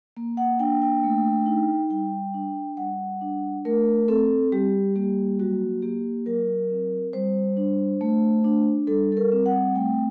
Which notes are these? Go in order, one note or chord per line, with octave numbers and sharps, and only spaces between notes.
A#3
F#5
D4 G5
G5
A3
D#4
G3 G5
D4
G3 F#5
D4
A3 A#4
C4 A4
G3 G4
A#3 G4
F#3 F#4
A#3 G4
F#3 A#4
C4
G3 C5
D4
A3
D4
G3 A4
A4
A#4
C4
F#5
A3 G5